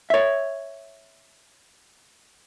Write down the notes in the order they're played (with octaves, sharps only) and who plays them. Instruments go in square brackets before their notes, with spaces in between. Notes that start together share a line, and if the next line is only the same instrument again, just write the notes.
[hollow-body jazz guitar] C#5 E5